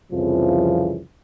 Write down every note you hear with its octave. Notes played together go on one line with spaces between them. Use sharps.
C2 F2 C#3 E3 F3